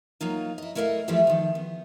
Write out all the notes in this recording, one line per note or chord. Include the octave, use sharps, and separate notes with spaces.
F#3 A#3 D#4 F4
E4 D#5
A3 E4 A#4 D5 D#5 F5
E3 F3 G3 A3 E4 F4
D#3 F3
B3